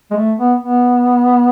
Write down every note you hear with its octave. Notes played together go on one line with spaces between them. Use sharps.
G#3
A3
B3
B3